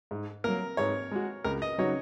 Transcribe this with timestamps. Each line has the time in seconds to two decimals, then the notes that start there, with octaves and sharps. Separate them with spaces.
0.11 G#2
0.44 F#3 A#3 A#4
0.77 G#2 C#5
1.11 G#3 F#4
1.44 C#2 A#4
1.62 D#5
1.78 C#3 F#3 D#4 F#4 C#5